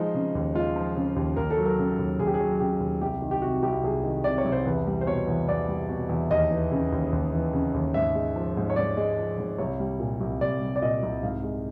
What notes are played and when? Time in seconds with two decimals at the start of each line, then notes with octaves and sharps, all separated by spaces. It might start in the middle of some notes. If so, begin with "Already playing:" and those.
Already playing: F3 G#3 D#4
0.14 C#3
0.35 D#2
0.55 G#3 F4
0.76 F3
0.96 C#3
1.16 D#2
1.36 D#2 A#4
1.51 A4
1.57 F#3
1.65 A#4
1.78 C#3
1.99 D#2
2.19 D#2 G#4
2.27 G4
2.34 G#4
2.40 F#3
2.60 C#3 G4
2.80 D#2
3.01 C2 G4
3.22 D#3
3.31 G4
3.42 C3 F#4
3.63 C2 G4
3.84 C2 G#4
4.04 D#3
4.24 C3 D5
4.38 C#5
4.45 C2
4.52 C5
4.65 E2 B4
4.87 G3
5.01 C5
5.06 B2 C#5
5.27 E2
5.48 E2 D5
5.68 G3
5.89 B2
6.09 E2
6.31 D#2 D#5
6.51 E3
6.71 C#3
6.92 D#2
7.12 D#2
7.33 E3
7.53 C#3
7.74 D#2
7.94 G#2 E5
8.15 G#3
8.36 F3
8.57 G#2
8.70 C#5
8.76 G#2 D5
8.97 G#3
9.18 F3
9.38 G#2
9.58 C2 C#5
9.80 G3
10.00 A#2
10.21 C2
10.41 C2 D5
10.61 G3
10.76 D5
10.82 A#2 D#5
11.03 C2
11.23 G#2 F5
11.44 G#3